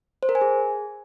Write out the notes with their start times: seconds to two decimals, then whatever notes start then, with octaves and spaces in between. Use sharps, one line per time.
0.23 C5
0.29 A#4
0.35 G#5
0.41 G#4